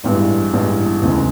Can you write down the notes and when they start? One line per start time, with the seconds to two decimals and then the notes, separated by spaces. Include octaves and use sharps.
0.04 A1 G2 E3 G#3
0.53 A1 G2 E3 G#3
1.01 E1 D2 C#3 E3 G#3